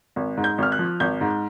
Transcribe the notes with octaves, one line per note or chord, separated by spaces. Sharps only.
G#1
G#2
G6
G#1 F6
F#6
F3
G#1 G6
G#2